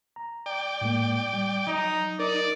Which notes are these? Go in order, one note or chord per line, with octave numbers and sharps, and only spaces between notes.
A#5
D5 G5
A2 G#3 A#3
G3
F#3 D#4
D#4 A#4 D5